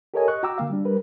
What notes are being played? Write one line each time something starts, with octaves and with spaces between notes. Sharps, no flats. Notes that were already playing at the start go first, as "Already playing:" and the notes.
G4 A4 A#4 C#5 D#5 G#5
D#5 C#6 F#6
F#4 G5 A#5 D6 E6
D3 A#3 F5
G3 D4
G3 A#4 B4